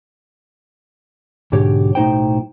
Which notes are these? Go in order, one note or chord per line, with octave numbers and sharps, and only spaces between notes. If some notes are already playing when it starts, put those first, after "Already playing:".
B1 G#2 D3 G4 C#5
B1 A2 D#4 C5 G5